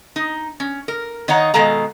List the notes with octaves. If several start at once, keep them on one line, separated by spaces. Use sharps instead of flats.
D#4
C#4
A#4
D#3 D#4 C#5 F5 F#5 A#5
B2 D#3 G#3 A4 F5 A#5